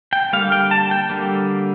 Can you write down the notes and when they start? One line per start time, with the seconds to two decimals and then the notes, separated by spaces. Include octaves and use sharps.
0.13 G5
0.33 D3 G3 A#3 F5
0.52 G5
0.71 A5
0.91 G5
1.10 D3 G3 A#3